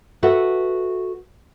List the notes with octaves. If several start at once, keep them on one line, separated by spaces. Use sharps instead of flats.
F#4 A4 B4 E5 F#5